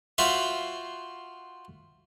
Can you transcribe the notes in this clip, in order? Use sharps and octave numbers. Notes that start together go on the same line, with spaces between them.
F4 F#4 C5 E5